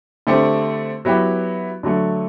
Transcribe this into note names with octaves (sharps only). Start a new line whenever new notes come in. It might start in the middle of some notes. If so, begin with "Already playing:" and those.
D3 A3 C4 G4
F#3 B3 E4 G4
D3 F#3 A3